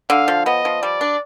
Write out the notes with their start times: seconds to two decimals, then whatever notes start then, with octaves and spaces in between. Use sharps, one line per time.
0.10 D3 F5
0.28 F3
0.46 B3 D#5
0.65 F3
0.82 G3 D5
1.01 D4